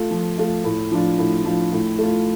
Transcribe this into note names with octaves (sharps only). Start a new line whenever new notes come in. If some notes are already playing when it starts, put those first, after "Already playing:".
Already playing: A3 F4
F3
A3 F4
A2
F3 D4 F4
A2
F3 D4 F4
A2
A3 F4